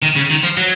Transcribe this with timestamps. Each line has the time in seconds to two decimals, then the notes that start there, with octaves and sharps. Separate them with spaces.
0.03 D#3
0.16 C#3
0.31 D#3
0.44 F3
0.57 F#3